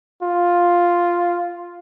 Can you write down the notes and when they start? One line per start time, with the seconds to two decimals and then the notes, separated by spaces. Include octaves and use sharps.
0.22 F4